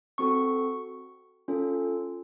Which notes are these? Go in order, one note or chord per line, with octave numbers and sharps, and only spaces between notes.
C4 F#4 A4 C#6
C#4 F4 A4